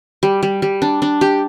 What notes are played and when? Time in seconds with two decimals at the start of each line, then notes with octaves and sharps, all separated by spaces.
0.23 G3
0.43 G3
0.62 G3
0.82 D4
1.02 D4
1.21 G4